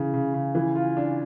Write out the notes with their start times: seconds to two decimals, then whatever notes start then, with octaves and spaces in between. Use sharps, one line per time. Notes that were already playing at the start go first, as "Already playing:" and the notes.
Already playing: C#3 E3
0.13 C#3
0.34 C#3
0.55 E3
0.75 F4
0.97 D4